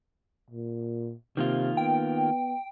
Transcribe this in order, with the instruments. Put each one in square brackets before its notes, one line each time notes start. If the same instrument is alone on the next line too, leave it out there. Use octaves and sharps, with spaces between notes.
[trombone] A#2
[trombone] C3 [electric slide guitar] D#3 A#3 F4
[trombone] B3 [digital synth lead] G5